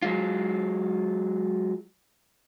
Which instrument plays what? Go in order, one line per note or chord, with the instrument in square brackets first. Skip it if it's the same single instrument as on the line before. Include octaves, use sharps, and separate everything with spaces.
[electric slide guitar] F#3 G#3 F4